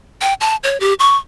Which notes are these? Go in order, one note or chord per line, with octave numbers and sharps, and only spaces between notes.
G5
A5
C#5
G4
C#6